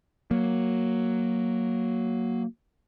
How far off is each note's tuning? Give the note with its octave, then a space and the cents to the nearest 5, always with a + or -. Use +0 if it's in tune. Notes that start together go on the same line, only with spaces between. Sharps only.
F#3 +0 A#3 +0